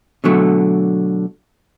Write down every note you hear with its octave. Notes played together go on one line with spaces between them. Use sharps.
B2 D3 F#3 A3